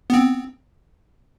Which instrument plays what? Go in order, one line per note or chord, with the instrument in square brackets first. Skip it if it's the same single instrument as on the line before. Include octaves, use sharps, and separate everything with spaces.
[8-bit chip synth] B3 C4